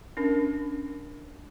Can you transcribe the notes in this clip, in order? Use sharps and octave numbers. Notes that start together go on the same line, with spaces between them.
C#4 D4 A#4